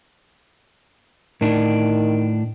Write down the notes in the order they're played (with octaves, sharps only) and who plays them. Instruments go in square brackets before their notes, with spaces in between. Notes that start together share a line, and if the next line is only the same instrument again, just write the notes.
[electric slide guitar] A2 D4 [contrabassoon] D#3